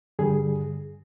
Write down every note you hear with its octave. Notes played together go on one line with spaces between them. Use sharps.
G2 D3 G3 G#4